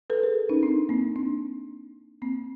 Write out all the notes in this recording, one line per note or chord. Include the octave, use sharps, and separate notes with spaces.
A4 B4
G#4 A#4
C#4 D#4
C4 D4
A#3 C4
C4 D4
A#3 C4